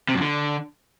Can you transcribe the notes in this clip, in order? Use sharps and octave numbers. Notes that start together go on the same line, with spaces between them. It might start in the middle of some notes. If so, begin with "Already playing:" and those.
C3
F#2
D3